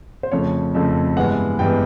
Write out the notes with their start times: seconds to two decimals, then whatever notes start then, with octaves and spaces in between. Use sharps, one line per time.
0.23 C5
0.32 F2 C#3 F3 A3 C#5
0.74 F2 C#3 F3 A3
1.17 G2 E3 G#3 B3 F#5
1.59 G2 E3 G#3 B3 G5